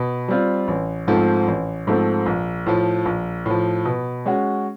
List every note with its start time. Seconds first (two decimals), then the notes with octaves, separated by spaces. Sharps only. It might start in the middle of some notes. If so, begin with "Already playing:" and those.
Already playing: B2
0.28 G3 C4 F4
0.68 A1
1.08 G#2 F3 A3 C4
1.48 A1
1.87 G#2 F3 A3 C4
2.26 A#1
2.66 A2 F3
3.06 A#1
3.46 A2 F3
3.85 B2
4.26 G#3 C#4 F#4